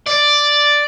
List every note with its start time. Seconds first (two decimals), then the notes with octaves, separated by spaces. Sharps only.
0.07 D5